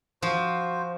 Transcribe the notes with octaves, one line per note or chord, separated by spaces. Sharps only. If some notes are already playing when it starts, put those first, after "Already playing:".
F3 F#4 C5